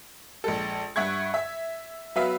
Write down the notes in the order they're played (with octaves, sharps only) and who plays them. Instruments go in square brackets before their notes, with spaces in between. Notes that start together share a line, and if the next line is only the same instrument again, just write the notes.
[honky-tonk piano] A#1 G#3 A4
G2 E5 F#5 C#6 G#6
E5
F#3 B3 B4 E5 F5